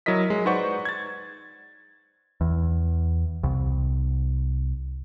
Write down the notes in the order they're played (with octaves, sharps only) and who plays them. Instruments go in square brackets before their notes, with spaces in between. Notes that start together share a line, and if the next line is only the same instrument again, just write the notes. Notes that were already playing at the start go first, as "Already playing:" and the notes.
[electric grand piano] F#3 E4 A#4 D#5 B6
F#3 G#3
D#4 B4 C5 D5 F#5 C#6
G#6 A6
[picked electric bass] E2
C2